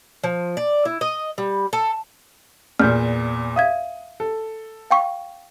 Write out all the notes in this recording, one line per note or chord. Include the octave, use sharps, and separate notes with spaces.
F3
D5
E4
D#5
G3
A4
E2 A#2 F6 G6
E5 F5 D#6 G#6
A4
F5 G5 C#6